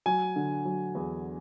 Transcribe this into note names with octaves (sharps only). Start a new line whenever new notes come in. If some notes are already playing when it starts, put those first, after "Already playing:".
F#3 G#5
D3
F#3
E2